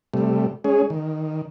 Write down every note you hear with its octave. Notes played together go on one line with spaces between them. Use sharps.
C3 G3 A3
G#3 C#4 G#4
D#3